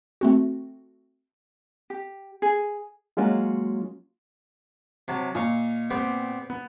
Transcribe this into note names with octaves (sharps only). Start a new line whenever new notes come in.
A3 C4 F#4
G4
G#4
F#3 G#3 A#3 C#4 F4 F#4
C3 F#3 A5
A#2 D#5 F5 C#6
B3 C4 G4
B3